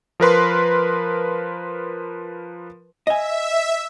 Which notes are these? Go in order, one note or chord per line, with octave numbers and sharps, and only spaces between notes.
F3 A#4 B4 C6
D#5 E5 G#5